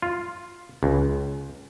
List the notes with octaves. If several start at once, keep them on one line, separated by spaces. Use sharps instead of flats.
F4
C#2